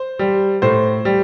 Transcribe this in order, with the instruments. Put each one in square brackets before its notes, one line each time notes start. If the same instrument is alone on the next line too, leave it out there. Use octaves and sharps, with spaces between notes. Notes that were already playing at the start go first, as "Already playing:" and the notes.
Already playing: [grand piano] C5
G3
A2 C5
G3